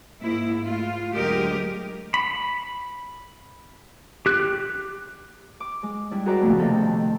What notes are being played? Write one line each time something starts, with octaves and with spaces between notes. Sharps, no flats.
G#2 A#3 E4
A3 F4
D2 F#3 G#3 G4 A#4 D#5
B5
G4 F#6
D6
G#3
G2 G3 E4
F#4 G#4 A#4 C5 D5 E5
A#2 C#3 F3 A3 B3
F2 C3 D#3 A3 A4